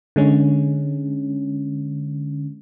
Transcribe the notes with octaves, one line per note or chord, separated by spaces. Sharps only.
D3 G#3 C#4